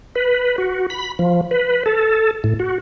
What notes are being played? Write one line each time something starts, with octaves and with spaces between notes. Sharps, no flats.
B4
F#4
B5
F3
B4
A4
A2
F#4